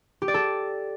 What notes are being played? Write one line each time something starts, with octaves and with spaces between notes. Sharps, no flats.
G4
D5
A4